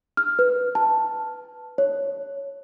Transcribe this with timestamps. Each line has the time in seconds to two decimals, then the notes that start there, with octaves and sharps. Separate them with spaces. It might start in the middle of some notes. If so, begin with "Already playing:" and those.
0.17 F6
0.39 B4
0.75 A5
1.78 C#5